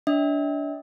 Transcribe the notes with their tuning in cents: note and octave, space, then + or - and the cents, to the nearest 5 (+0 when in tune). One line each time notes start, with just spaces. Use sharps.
D4 -25 E5 -40